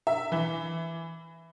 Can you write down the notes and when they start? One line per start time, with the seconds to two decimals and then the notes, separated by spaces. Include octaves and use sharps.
0.07 E5
0.32 E3